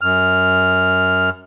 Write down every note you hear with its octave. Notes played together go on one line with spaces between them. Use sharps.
F#2 F6